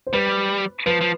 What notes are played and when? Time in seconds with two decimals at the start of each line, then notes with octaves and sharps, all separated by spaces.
0.07 C5
0.13 G3 B4
0.86 F3 B4
1.01 F3